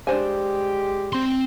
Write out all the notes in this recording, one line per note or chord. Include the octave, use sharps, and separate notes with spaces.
G#3 D4 G4 C5 G#5
C4 C6